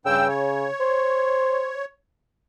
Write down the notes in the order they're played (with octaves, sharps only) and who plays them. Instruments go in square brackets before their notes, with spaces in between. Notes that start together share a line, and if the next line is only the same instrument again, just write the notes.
[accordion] G2 G5 E6 [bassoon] C#3
[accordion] C#5
[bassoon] C5